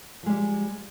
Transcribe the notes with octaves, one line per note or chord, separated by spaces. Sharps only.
F3 G3 G#3